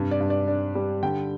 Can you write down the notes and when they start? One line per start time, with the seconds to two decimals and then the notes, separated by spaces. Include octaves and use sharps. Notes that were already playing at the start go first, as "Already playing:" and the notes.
Already playing: G2 C3
0.11 D5
0.21 G2
0.30 D5
0.48 D4
0.75 G3
1.03 D3 G5